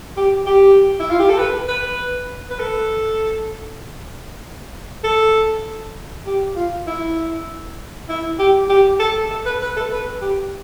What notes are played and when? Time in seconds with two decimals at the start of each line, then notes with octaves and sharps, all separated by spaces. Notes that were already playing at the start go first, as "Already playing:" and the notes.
0.17 G4
0.46 G4
1.00 E4
1.10 F4
1.19 G4
1.29 A4
1.38 B4
1.68 B4
2.50 B4
2.60 A4
5.04 A4
6.26 G4
6.56 F4
6.87 E4
8.09 E4
8.39 G4
8.69 G4
9.00 A4
9.31 A4
9.46 B4
9.62 B4
9.77 A4
9.91 B4
10.21 G4